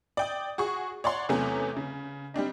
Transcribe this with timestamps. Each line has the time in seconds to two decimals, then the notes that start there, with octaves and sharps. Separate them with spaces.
0.17 D5 G5 D#6
0.58 F#4 G#4 C#6
1.04 C#5 D5 F#5 C6
1.29 E2 C3 F#3 A3 B3 C#4
1.77 C#3
2.34 G3 C4 D4 D#4